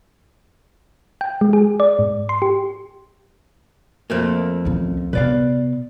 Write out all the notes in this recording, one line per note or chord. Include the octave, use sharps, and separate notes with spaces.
G5
G#3
G#4
D5
G#2
C6
G4
F2 A3 A#3
C#2 F4
C3 B3 B4 D5 F5